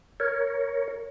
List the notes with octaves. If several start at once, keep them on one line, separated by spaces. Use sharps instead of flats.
A#4 C#5